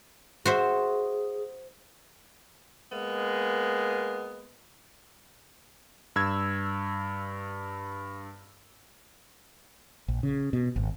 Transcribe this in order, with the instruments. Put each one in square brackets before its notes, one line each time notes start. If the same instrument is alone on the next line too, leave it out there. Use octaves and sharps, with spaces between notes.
[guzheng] F#4 C5 E5 [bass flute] G#4
[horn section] G#3 A#3 B3
[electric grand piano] G2 E6 G#6
[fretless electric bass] A#1
C#3
B2
G#1